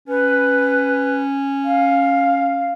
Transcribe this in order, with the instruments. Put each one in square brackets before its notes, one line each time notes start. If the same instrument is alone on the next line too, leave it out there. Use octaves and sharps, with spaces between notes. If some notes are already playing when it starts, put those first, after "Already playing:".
[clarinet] C#4 [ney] B4
[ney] F5